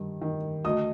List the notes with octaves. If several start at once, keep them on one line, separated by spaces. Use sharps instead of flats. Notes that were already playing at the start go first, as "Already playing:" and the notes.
Already playing: G2 D#3
D#3
D2 D#5 D#6